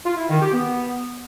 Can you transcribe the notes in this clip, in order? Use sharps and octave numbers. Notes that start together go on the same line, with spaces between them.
F4
E4
D#3
G4
B3